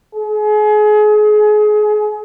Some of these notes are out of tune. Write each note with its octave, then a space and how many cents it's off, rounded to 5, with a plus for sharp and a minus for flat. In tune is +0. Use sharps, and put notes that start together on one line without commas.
G#4 +30